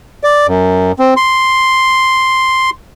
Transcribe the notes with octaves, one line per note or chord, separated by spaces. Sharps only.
D5
F#2
C4
C6